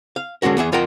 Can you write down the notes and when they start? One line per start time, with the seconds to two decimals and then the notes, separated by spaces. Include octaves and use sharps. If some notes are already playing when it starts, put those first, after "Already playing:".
0.16 F5
0.42 D3 G#3 C#4 F#4 A#4
0.57 E2 B3 G#4 E5
0.72 F2 F4 A#4 F#5 G5 A#5